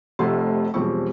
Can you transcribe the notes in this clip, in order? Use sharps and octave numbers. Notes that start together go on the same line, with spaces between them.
F1 F2 C3 A3 F#4 C6
E1 F3 G3 C4 G4 C#6